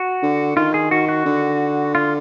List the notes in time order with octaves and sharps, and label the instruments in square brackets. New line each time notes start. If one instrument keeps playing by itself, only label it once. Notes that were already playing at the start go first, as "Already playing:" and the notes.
Already playing: [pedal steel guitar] F#4
[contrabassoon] D3
[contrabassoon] D#3 [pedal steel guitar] F4
[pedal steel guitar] G#4
[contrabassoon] D#3 [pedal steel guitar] F#4
[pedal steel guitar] F#4
[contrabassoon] D3
[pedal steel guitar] F4